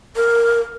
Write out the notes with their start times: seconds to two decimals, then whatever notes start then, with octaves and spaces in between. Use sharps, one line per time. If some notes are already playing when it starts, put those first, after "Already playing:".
0.16 A#4